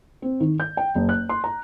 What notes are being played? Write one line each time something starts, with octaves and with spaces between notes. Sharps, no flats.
C4
D#3
G6
G5
F#1
F#6
C6
A#5